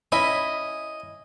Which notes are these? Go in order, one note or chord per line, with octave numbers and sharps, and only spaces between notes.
C#4 E4 D#5 B5